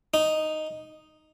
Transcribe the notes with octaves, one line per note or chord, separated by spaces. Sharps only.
D#4